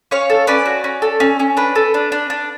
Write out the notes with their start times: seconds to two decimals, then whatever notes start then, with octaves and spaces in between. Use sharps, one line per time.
0.11 C#4 C#5 F5
0.30 A4
0.47 C#4 B4 D5
0.66 F#4
0.84 C#4
1.02 A4
1.20 C#4
1.40 C#4
1.57 D4 B4
1.75 A4
1.94 D4
2.12 D4
2.30 D4